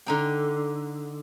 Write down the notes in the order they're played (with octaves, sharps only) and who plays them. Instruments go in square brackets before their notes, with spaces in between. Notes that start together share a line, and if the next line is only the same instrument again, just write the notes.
[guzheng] D3 D#4 G5